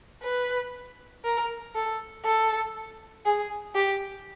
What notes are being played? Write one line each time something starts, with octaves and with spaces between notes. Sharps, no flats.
B4
A#4
A4
A4
G#4
G4